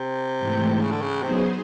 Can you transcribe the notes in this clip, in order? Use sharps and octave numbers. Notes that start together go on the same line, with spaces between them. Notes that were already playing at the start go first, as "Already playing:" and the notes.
Already playing: C3
G#2 E3 A3
C#3
D3
C#3
C3 F#3 B3 D#4 G#4 C5
C#3